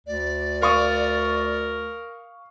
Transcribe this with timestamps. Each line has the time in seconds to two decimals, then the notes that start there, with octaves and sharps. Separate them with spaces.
0.07 D2 D5
0.62 A#4 F5 C#6 D#6